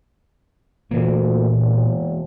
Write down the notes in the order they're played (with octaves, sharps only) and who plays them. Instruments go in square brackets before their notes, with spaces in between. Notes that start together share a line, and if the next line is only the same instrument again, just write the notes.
[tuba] D2 [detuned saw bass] A#2 [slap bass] E3 A#3
[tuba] E1